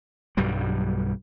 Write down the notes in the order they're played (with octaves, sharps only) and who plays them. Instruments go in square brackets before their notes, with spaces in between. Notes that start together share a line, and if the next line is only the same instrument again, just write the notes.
[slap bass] B1 G2 F#3 G3